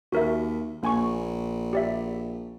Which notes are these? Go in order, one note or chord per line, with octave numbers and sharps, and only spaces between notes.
D#2 F#4 A#4 E5
A#1 A#3 G#5 C#6
G4 D5 E5